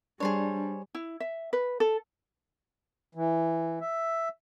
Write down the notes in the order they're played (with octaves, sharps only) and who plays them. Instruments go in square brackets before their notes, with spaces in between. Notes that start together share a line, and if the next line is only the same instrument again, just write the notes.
[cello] G3 [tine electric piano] D4 [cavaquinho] G#4 C5 C#5
[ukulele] E4
E5
B4
A4
[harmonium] E3
E5